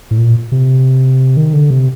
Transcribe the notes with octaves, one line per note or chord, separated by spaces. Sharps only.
A2
A#2
C3
D#3
D3
C3